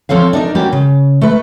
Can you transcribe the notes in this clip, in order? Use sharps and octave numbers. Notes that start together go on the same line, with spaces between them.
F3 C4 A4 C#5 F5
D4 D#4 A#4
G3 A#3 C#4 F#4 G4
C#3
A3 B4